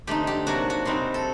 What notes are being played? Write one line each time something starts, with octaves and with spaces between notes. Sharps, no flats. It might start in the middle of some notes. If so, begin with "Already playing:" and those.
D3 A3 C4 D#4 G4
G4
C3 F#3 A#3 D4 F#4
F#4
C3 G3 C4 D#4
A4